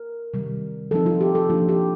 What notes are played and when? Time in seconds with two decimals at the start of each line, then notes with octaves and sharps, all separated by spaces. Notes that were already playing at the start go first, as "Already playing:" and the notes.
Already playing: A#4
0.34 C3 D#3 G3
0.91 C3 F3 C4 D#4 A4
1.06 F4
1.21 G4
1.35 A4
1.50 F3 A#3 D4 F4
1.69 G4